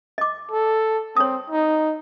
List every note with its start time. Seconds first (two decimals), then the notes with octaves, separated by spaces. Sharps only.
0.18 D#5 D6
0.51 A4
1.16 C4 C#5 D#6
1.50 D#4